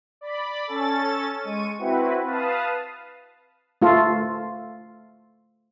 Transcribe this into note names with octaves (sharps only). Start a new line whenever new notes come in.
D5 B5
C#4 A4 A6
G#3 C#6 D#7
C4 E4 F#4 B4
B4 F5 A5 D#6
A3 F4 A4